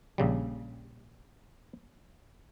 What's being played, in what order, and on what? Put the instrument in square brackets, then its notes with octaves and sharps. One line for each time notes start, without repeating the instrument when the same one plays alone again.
[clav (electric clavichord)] A#1 C#3 G3